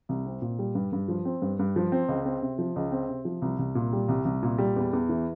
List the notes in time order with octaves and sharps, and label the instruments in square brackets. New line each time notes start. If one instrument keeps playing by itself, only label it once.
[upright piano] C2
C4
A#2
G3
G2
G2
F3
C4
G2
G2
F3
C4
C#2
C4
C3
F3
C#2
C4
C3
F3
C2
C2
A#2
G3
C2
C2
A#2
G3
E2
E2
E3